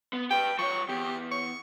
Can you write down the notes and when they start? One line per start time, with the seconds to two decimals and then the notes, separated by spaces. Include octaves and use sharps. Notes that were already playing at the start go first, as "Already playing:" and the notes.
0.13 B3
0.31 G4 B4 G5
0.59 F3 C#5 C#6
0.89 E2 G4
1.31 C#6